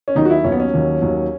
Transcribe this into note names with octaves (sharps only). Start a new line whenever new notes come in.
C#4
D#2 D#3 F#3 D#4
F#4
E4
D#2 D#3 F#3 C#4
B3
C#4
D#2 D#3 F#3
D#2 D#3 F#3